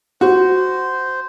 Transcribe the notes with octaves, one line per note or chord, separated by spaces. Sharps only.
F#4 C5